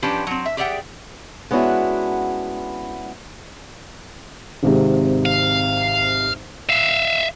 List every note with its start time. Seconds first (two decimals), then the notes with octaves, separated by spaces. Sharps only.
0.02 F3 C#4 D4 G4 B4
0.27 F#3 C4
0.46 E5
0.57 G4 G#4 D5 E5 F#5 G5
1.51 G#3 B3 C#4 D4 E4 F#4
4.63 G#1 G#2 C3
5.26 F5
6.69 E5 F5